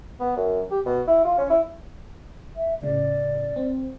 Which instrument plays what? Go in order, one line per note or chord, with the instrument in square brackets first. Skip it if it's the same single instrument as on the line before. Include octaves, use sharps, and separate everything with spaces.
[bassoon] B3
F#2
G4
B2
E4
F4
C#4
E4
[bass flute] E5
[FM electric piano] A2 C#3 [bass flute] D5
[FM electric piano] C4